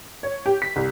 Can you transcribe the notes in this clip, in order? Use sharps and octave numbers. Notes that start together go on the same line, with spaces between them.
C#5
G4
B6
C2